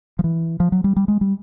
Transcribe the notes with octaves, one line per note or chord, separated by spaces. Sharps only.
F3
E3
F3
F#3
G3
G3
G#3
G3